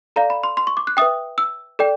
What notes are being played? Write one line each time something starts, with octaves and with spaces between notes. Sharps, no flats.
A4 D5 F5 A#5
B5
C6
C6
C#6
D6
F#6
B4 E5 G5 D#6
E6
A4 D5 G5